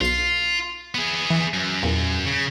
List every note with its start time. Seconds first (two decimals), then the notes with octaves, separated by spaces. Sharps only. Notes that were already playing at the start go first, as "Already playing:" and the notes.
0.01 B1 F4 C7
0.95 B3 G#4
1.30 E3
1.54 F#2
1.83 E2 A#2
2.26 C#3